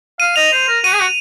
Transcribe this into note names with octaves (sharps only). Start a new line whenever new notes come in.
F5 D#7
D#5 F7
C5
A#4
F#4 D#7
G#4
F#4